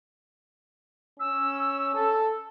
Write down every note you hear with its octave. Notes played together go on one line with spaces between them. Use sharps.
C#4 E6
A4